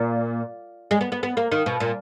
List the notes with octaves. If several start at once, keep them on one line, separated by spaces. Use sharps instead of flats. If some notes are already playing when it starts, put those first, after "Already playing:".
Already playing: A#2
G#3
B3
B3
B3
A#3
D#3
B2
A#2